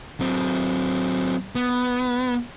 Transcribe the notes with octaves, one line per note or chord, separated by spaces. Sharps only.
F#3 C4
B3